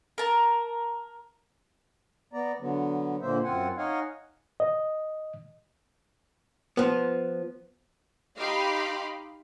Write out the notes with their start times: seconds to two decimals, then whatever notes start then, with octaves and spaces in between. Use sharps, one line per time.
0.18 A#4 A5
2.33 B3 D5 A#5
2.60 D3 F#3 B3
3.22 A#2 D3 A#3 C5 E5
3.44 F#2 C4 F4 F#5 G#5
3.78 D#4 C#5 D#5 F5 F#5 G#5
4.60 D#5
6.77 F3 B3
8.37 D#4 G4 F5 B5 C6 D6